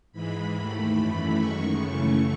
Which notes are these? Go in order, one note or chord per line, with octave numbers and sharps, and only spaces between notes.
G#2 E3 G#3 B5
D#2 D#3 A3
F#2 E3 A3
F#2 D#3 G#3 C#6
F#2 C#3 E3 A3